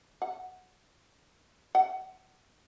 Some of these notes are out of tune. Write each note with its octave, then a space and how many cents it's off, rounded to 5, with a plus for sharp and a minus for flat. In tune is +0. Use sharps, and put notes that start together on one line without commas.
F#5 +0
F#5 +15